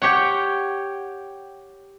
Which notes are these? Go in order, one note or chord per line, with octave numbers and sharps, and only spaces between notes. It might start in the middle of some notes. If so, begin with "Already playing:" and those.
G4 C#5 F#5 G5